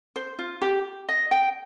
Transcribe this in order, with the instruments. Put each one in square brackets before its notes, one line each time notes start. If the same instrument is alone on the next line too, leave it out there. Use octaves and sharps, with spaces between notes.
[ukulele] C5
F4
G4
D#5
G5